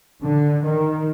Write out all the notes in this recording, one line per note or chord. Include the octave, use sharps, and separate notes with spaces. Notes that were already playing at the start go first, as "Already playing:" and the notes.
D3
D#3